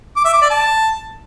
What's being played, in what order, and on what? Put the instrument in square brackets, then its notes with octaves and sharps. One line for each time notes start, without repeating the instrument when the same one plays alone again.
[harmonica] D6
E5
D6
D5
A5